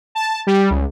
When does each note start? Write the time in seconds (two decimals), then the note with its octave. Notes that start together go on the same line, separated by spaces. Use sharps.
0.15 A5
0.47 G3
0.70 C#2